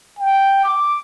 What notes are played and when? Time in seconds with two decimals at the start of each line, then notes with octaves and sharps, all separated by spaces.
0.19 G5
0.65 D6